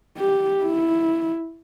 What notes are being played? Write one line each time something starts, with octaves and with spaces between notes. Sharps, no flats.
G4
E4